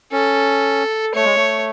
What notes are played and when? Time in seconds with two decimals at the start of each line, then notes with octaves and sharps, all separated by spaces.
0.12 C#4 A4
1.15 A3 C#5
1.25 G#3
1.36 A3